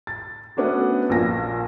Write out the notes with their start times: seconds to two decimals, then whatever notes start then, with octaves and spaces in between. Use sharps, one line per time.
0.07 A6
0.57 A3 B3 C#4 D4 F#4
1.10 A#1 A#2 G#5 A#6